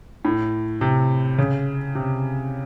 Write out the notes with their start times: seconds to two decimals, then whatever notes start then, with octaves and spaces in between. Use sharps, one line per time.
0.25 A2
0.81 C3
1.38 C#3
1.95 C3